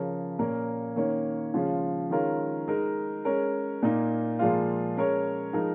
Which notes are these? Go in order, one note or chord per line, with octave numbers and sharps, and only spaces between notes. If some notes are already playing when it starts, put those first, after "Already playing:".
Already playing: C#3 F3 C#4 A#4
A#2 A#3 C#4 A#4 C#5
D#3 A#3 C#4 A#4 C#5
C#3 F3 G#3 C#4 F4
D#3 G#3 C#4 F4 A#4
G#3 D#4 A#4
G#3 C#4 A#4 C#5
A#2 A#3 D#4
A#2 F3 G#3 F4
G#3 C#4 A#4 C#5
F3 G#3 D#4 A#4